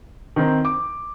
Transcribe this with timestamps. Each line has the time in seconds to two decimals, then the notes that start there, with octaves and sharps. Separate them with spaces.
0.36 D#3 C4 A#4
0.65 D6